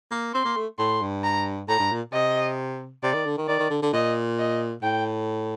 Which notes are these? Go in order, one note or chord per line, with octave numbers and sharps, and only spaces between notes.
A#3
C4 C6
A#3
A3
A2 C6
G2
A#5
A2 A#5
G2
A#2
C3 D#5
C3 D5
D#3
D3
D#3
D#3 D5
D#3
D3
D3
A#2 D#5
D#5
A2 G5